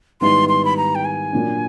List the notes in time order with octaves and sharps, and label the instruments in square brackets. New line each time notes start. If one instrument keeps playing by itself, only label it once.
[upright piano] G#2 D#3 G3 B3 E4 [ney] C6
[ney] C6
B5
A#5
G5
G#5
[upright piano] A#2 F#3 A#3 D4